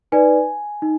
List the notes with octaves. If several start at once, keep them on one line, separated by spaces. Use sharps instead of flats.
D#4 B4 D5 G#5
D#4